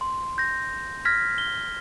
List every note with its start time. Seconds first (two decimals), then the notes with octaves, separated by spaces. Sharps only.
0.01 C6
0.38 G6 A#6
1.05 F6 G#6 A#6 B6
1.38 G7